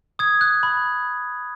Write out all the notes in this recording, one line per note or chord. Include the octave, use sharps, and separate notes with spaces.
D#6 G#6
F#6
B5